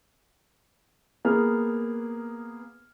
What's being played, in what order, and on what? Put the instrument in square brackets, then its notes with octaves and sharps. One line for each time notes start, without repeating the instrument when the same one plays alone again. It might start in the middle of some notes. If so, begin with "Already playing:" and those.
[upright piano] A#3 B3 G#4 F6